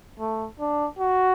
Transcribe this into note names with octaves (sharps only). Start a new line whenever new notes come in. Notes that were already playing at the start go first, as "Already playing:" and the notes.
A3
D4
F#4